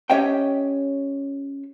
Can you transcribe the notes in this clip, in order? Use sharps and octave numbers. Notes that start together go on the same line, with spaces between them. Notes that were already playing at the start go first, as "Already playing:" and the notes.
C#4 G4 C#5 D#5 E5 G5